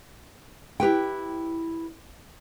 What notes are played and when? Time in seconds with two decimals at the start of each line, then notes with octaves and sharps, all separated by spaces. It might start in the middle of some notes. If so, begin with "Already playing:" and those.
0.80 E4 G4 B4 G5